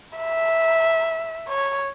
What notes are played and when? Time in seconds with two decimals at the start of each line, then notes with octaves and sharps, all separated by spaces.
0.17 E5
1.49 C#5